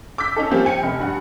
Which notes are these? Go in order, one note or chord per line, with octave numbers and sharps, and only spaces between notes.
D6 E6 G6 B6
C#4 D#4 A4
F3 G3 A#3 C4 C#4 G4
G5 G#5 C#7
F1
G2 F#5